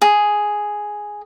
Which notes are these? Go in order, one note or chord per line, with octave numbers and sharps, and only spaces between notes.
G#4